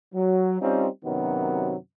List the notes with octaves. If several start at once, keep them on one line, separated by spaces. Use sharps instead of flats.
F#3
G3 C4 C#4 D#4 F4
F#2 C3 D#3 F#3 B3